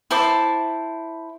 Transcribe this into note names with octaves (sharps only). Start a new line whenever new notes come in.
E4 C5 A5 D6